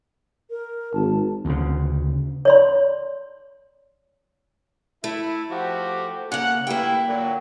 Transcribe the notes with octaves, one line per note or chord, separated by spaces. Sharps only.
A#4
G#1 A5
D2 C#3
C#5 D5 C6
A3 E4
F3 F#4 G4
C#3 A#3 F#5
G2 A3 A#3 E4 G5
A#2 D3 F#3